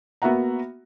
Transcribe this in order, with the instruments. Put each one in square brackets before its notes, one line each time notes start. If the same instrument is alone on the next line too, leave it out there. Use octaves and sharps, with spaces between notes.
[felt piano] A#3 B3 F#4 E5 F#5 A#5